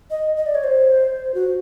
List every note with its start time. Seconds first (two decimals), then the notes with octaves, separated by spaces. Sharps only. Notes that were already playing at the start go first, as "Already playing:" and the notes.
0.10 D#5
0.37 D#5
0.46 D5
0.55 C#5
0.64 C5
1.34 F#4